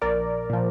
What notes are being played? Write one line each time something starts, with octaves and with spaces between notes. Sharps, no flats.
A#1 A#4 D5
A#2 F3